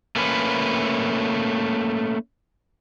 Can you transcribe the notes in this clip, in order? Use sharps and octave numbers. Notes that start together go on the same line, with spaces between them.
A3 A#3 C#4 B4